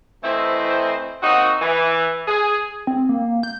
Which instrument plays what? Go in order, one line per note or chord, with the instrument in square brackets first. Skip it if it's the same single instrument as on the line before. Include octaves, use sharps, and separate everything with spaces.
[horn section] E3 A3 C4 E4 C5 D#5
A#3 C4 D#4 F#4
E3
G#4
[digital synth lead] C4
A#3
G6